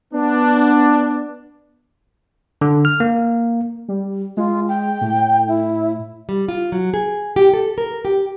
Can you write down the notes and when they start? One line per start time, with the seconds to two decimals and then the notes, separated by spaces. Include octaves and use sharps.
0.14 B3 D4
2.61 D3
2.85 F6
3.00 A#3
3.89 G3
4.37 G#3 F4
4.68 G5
5.01 A2
5.48 E4
6.29 G3
6.49 F4
6.72 F#3
6.94 G#4
7.36 G4
7.54 A4
7.78 A#4
8.05 G4